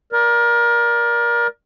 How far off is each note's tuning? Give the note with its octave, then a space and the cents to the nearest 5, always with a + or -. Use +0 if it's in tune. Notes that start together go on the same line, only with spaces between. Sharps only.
A#4 +25 D5 +0